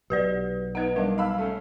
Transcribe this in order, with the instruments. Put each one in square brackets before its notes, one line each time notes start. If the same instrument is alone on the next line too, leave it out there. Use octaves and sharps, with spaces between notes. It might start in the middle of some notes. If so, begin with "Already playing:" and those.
[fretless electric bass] B1 [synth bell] G4 B4 D5
[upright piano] B3 D#4 G#6 [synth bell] F#5
[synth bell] G3 [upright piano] A#3 D4 D#4
[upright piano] F5 B5 E6
A3 C#4